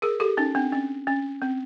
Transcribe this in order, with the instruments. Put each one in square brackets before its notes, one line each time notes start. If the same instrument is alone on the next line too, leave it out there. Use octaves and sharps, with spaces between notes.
[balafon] G#4 A#4
G4 A4
C#4 D#4
C4 D4
C#4
C#4
C4